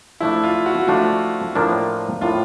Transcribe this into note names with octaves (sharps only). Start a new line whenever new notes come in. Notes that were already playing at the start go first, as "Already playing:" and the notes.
F3 A3 D4 E4
F4
F#4
F3 A3 D4 F4
A2 F3 A#3 D4
A2 F3 A#3 D4 F4